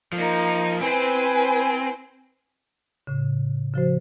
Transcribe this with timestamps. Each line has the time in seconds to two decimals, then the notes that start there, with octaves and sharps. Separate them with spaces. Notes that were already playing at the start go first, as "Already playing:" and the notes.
0.13 F3 A#3 D#4
0.81 C4 E4 B4 C5 G#5
3.07 A2 C#3
3.74 C#3 F3 F#4 C5